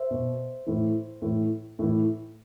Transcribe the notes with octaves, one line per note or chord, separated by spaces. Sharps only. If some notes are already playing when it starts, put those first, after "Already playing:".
Already playing: C5 E5
B2
A2 E3
A2 E3
A2 E3